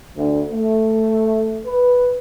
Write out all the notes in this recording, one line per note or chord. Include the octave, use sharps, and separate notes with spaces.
D2
A3
B4